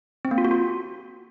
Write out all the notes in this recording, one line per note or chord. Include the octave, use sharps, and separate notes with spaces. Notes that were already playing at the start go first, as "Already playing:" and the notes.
C4
A#3
F4
F#4
F4